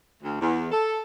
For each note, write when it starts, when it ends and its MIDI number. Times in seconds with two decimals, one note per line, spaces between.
0.23 0.40 38
0.40 0.71 40
0.71 1.02 69